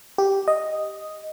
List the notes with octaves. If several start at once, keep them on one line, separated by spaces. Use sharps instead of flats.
G4
D#5